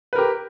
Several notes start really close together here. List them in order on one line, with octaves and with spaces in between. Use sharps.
B4 A#4 G4